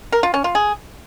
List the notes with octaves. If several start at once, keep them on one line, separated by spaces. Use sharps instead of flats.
A#4
F4
C#4
F4
G#4